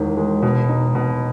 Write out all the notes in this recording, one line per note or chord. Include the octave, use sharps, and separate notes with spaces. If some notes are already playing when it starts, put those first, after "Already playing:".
Already playing: E1 D#3
G#3
B2
D#4
B2